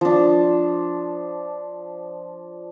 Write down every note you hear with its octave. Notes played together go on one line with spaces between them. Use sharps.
F3 D4